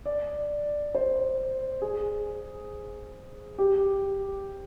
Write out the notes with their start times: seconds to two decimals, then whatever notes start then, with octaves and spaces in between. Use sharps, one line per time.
0.06 D5
0.95 C5
1.82 G#4
3.58 G4